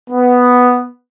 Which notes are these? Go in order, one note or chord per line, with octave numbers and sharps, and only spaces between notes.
B3